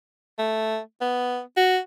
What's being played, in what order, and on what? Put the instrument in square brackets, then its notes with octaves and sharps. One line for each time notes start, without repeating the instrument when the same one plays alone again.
[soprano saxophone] A3
B3
F#4